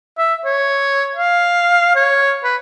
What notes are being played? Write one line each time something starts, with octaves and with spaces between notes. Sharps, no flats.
E5
C#5
F5
C#5
B4